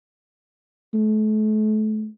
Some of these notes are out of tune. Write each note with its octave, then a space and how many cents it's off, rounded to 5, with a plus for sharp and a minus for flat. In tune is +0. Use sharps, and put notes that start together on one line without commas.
A3 -35